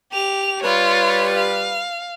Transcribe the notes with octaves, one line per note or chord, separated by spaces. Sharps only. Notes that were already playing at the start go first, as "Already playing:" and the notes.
G4 F7
G3 F4 B4 C#5
F5